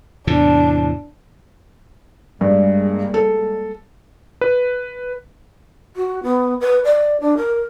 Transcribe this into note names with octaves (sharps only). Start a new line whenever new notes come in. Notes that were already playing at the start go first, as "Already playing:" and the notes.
E2 A2 C3 D4
G2 G3 G#3 A#3
A4
B4
F#4
B3
B4
D5
D4
A#4